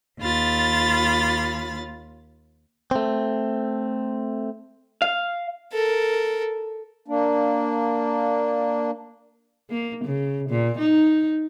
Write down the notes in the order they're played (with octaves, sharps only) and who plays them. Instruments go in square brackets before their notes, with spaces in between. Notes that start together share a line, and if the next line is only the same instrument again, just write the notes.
[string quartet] D#2 F4 B5 A6
[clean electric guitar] A3 C4
F5
[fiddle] A4 A#4
[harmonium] A#3 D4
[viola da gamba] A#3
C#3
A#2
D#4